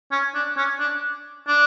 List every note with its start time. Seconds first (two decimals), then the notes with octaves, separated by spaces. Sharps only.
0.12 C#4
0.35 D4
0.57 C#4
0.80 D4
1.48 D4